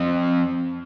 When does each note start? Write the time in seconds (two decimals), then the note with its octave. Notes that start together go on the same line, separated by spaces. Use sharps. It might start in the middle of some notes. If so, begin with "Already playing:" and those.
Already playing: F2